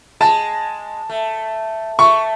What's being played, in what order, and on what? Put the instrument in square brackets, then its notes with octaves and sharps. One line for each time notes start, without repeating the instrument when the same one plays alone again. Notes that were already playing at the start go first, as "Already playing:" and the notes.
[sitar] G#3 [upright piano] A5
[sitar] A3
[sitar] A3 [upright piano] C#6